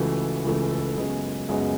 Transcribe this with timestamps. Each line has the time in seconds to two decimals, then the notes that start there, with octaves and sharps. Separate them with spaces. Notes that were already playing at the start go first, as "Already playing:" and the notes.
Already playing: C#2 C#3 E3 A3 F#4
0.44 C#2 C#3 E3 A3 G#4
0.71 A4
0.97 F#2 C#3 G#3 B3 G#4
1.49 F#2 C#3 G#3 B3 G#4